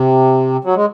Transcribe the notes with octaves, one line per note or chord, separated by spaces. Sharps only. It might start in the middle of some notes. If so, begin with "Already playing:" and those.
Already playing: C3
F#3
G#3